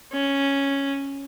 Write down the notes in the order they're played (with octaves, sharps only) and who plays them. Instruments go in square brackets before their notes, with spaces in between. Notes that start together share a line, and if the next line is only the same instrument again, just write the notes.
[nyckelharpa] C#4